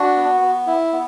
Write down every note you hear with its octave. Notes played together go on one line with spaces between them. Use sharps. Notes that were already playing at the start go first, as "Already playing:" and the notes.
Already playing: D4 F#4
B3
B3
E4
B3